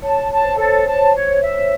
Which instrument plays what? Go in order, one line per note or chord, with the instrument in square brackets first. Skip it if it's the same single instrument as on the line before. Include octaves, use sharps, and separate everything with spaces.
[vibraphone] C#5 [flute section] A5
[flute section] A5
[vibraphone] C5
[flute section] A4 [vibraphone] C#5
[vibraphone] C5
C#5
[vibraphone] C5 [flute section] A5
[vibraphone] C#5
C5
[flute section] C#5
E5